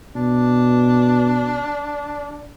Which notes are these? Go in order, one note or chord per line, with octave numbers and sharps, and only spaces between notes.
B2 D4